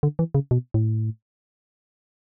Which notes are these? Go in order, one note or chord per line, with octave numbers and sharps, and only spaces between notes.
D3
E3
C#3
B2
A2